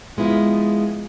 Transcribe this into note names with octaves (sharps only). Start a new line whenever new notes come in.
F3 G#3 B3 E4 F4